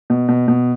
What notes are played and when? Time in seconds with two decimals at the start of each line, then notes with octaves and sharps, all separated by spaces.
0.10 B2
0.28 B2
0.48 B2